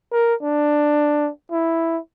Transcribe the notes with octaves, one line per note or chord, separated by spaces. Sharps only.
A#4
D4
E4